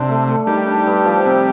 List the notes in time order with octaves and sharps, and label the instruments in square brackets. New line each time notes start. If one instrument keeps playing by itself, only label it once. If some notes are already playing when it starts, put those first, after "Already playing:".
Already playing: [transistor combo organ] C3 [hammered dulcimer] D4
[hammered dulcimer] A3
A3
[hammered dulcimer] D#3 [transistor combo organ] G3
[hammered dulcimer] D4
G2
F3
C3